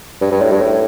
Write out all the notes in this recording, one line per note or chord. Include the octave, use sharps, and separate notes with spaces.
G2
G2
A2
G2
A2